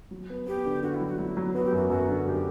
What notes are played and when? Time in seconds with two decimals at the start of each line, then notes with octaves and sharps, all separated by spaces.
0.11 F#3
0.30 B3
0.47 B3 G4
0.66 D3
0.83 D3 F#4
0.95 E4
1.01 F#3
1.07 F#4
1.18 F#3 E4
1.37 F#3
1.54 B3 F#4
1.65 G4
1.72 F#2 F#4
1.90 F#2 F#4
2.08 D3
2.25 F#2 G4